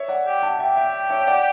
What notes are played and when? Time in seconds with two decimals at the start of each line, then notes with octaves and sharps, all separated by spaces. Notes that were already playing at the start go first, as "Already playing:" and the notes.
Already playing: C#5 E5
0.08 D5 F#5
0.26 G4
0.43 F#5 A5
0.59 G4 E5 G5
0.76 E5 G5
1.10 C#5 E5
1.27 D5 F#5